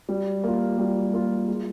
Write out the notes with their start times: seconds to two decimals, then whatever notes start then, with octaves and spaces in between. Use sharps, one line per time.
0.09 G3
0.44 A#3 F4
0.78 G3
1.13 A#3 F4
1.48 G#3